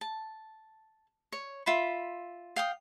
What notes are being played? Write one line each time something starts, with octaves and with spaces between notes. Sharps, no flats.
A5
C#5
F4 E5 B5
F5 G5 D#6